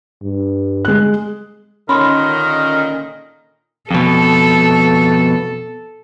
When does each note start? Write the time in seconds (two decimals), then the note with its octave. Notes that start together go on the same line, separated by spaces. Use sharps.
0.23 G2
0.85 G#3 F#6
1.89 A#2 D3 D#3 C#4 A#4 B5 C6
3.91 F2 B2 A4